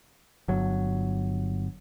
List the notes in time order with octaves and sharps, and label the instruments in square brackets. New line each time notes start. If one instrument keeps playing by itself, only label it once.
[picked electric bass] G1 F#3